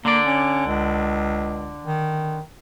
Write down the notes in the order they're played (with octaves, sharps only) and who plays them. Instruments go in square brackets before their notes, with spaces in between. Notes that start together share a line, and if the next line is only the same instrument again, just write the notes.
[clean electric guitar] D3 D5 [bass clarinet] A#3
[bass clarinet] C#4
C#2
D#3